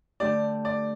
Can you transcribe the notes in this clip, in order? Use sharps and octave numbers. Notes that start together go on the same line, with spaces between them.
D3 A3 D4 G4 D5
D5